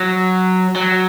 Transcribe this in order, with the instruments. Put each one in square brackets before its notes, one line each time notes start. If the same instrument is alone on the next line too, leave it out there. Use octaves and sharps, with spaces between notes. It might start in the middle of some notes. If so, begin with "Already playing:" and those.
Already playing: [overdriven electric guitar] F#3
F#3